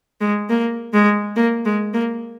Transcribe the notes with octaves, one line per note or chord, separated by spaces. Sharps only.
G#3
A#3
G#3
A#3
G#3
A#3